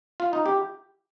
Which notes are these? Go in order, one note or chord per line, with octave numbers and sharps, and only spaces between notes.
F4
D#4
G4